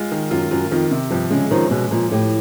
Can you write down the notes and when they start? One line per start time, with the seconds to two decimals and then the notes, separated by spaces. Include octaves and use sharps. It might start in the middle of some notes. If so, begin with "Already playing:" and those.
Already playing: G#3 F4
0.12 D#3
0.31 F#2 F4
0.51 F#2 F4
0.71 F2 D#3
0.91 C3
1.11 G2 F3
1.30 C#3 G#3
1.51 D#3 F3 C#4
1.71 B2 G#3
1.91 A#2 F3
2.11 A2 G4